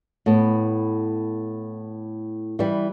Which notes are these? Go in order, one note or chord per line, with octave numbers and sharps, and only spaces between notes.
A2 B3
E3 G3